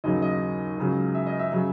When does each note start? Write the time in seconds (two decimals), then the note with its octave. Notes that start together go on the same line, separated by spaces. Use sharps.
0.04 D#2 C#3 F#3 D#5
0.22 D#5
0.78 C#2 C#3 F#3
1.15 E5
1.27 D#5
1.39 E5
1.52 C#3 F#3